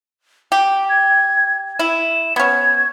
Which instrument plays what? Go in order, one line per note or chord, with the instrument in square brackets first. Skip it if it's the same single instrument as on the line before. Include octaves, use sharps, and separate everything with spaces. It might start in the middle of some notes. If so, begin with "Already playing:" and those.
[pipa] G4 [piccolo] G5
[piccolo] G#6
[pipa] E4 [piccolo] E7
[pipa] B3 C#4 [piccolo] G#6